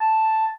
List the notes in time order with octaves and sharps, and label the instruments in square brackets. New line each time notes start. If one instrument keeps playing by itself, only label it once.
[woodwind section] A5